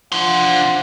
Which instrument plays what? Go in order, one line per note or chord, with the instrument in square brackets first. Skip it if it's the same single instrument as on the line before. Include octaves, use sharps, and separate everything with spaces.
[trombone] F3 [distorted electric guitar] D4 C6 [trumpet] F#5